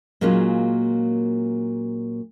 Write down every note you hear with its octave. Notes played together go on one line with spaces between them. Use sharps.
A#2 F#3 G#3 A#3 C#4 F4